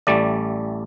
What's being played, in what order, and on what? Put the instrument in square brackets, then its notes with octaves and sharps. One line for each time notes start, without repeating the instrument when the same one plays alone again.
[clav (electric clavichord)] A1 G3 A3 D5